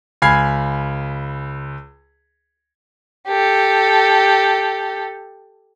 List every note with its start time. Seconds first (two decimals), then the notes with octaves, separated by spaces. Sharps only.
0.22 C#2 G#5 B5 F6 G#6 C7
3.28 G4 A4